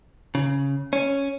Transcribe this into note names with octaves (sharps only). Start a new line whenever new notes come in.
C#3
C#4